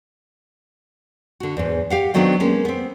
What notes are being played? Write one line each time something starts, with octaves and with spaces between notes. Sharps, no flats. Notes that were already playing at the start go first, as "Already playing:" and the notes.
D3 F#4
E2 G#2
G4 F5 F#5
D#3 F#3 A3 B3 C4 D4
G#3 A#3 C#4
B3 C4